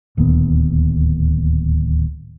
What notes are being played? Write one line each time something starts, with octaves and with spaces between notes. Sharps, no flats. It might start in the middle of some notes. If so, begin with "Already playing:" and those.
D1 D#2 A#2 B3